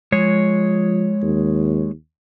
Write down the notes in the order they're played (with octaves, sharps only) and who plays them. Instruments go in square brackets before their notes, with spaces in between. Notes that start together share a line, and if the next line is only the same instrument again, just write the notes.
[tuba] F3 [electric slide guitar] G#3 C#5
[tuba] D#2